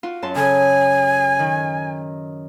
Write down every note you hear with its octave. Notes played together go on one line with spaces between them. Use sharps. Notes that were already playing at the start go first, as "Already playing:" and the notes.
F4 F#4
F#2 A5 C6
C#3 A4 G#5
D#3